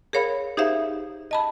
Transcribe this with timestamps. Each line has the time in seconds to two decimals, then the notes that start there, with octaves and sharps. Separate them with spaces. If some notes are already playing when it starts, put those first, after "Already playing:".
0.13 G#4 A#4 C#5 F5 B5
0.57 D#4 G4 G#4 C5 E5 F5
1.31 D#5 A5 B5